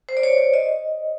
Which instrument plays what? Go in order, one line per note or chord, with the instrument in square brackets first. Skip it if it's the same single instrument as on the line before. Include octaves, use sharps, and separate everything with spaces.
[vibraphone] C5
D5
C#5
D5
D#5